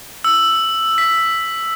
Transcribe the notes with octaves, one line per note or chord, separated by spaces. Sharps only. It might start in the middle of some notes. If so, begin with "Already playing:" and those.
E6
B6